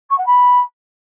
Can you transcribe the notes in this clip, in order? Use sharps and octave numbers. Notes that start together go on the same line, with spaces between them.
C#6
F#5
B5